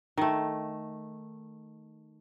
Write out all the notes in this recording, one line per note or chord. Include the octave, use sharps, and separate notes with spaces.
D#3 A3